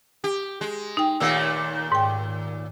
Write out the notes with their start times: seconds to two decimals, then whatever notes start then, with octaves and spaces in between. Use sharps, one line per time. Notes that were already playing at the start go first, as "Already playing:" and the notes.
0.24 G4
0.61 G#3
0.97 D#4 G5
1.20 D#2 A#2 A3 E6
1.92 G#2 G5